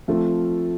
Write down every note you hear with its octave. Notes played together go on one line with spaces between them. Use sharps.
F3 A3 C4 F4 A4